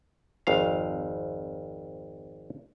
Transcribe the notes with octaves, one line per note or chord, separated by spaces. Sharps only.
G#1 F2 F5